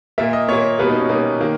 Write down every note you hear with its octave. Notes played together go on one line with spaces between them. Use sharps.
A#2 A#3 E5
D#5
A#2 A#3 C#5
B2 G3 A#3 B4
D#4
C#4
B2 G3 A#3 D#4
D#3 A#3